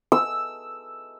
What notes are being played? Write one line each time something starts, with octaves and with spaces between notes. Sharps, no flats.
E6